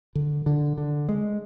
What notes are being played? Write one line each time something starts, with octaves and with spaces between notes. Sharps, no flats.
D3
D3
D3
G#3